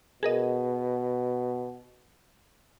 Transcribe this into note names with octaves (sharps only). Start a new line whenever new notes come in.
B2 G#4 A#4 D#5